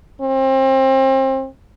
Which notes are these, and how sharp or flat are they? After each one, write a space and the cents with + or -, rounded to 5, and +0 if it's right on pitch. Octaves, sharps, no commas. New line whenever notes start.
C4 +30